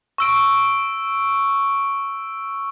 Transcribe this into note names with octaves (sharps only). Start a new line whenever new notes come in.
C#6 E6 D7